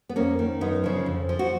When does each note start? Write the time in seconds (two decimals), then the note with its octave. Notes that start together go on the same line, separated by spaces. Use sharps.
0.09 B3
0.16 F2 A#3 C#4
0.39 D#3
0.61 F#2 B3 D#4
0.84 C#3 F3
1.06 F2
1.29 F3
1.39 F#4